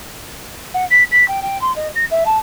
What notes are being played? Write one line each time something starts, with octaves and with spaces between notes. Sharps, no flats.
F#5
B6
B6
G5
G5
C6
D#5
A#6
E5
A5